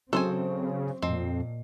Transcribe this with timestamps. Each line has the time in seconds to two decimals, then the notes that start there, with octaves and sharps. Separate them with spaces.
0.13 C#3 F#3 C4 F#4 A4 C5 G#5 C#6
1.03 F2 A#2 C4 D#5